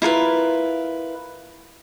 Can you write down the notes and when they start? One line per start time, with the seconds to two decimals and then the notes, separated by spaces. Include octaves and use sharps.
0.02 E4 F4 A#4 B4